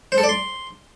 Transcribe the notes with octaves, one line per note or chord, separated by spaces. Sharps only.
C5
A4
D5
C6